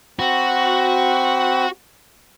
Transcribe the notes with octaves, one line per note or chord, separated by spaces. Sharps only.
C4 F#4 B5